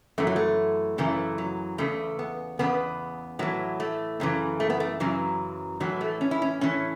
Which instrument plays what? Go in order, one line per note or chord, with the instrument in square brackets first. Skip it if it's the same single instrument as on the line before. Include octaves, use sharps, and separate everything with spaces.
[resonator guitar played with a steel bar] F#2 E3 A3
F#3
A3
F#2 C#3 E3 A3
F#3
E2 C#3 A3
B3
E2 C#3 B3
A2 E3 F#3
A3
F#2 C#3 E3
A3
B3
A3
F#2 C#3 E3 F#3
A2 E3 F#3
A3
C#4
E4
C#4
A2 E3 C#4